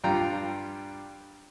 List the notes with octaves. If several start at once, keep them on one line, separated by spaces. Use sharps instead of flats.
G2 G3 F4 G5 A#5